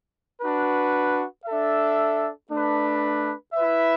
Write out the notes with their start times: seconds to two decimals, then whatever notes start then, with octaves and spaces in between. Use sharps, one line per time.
0.41 D4 F#4 B4
1.46 D4 A4 E5
2.49 A3 D4 B4
3.54 E4 B4 E5